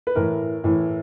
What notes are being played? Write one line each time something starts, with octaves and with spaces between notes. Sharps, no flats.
B4
A2 E3 A#4
A2 E3